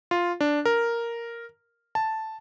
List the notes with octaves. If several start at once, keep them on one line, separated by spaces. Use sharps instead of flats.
F4
D4
A#4
A5